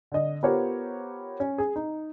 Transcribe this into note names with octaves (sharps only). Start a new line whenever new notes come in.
D3 D#5
B3 F4 G4 A#4 C5 C#5
C#4
G#4
D#4